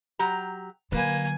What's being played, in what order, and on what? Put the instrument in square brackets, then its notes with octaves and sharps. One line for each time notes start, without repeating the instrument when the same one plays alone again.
[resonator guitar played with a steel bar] F#3 G4 A#5
[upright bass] D3 F#3 [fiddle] A#3 G#5 [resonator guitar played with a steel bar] B4